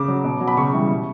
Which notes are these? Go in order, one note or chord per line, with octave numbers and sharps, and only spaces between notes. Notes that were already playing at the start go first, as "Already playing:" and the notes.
Already playing: C#3 D6
F#3
B2
F#3
B5
C#3 C#6
E3 G3
B2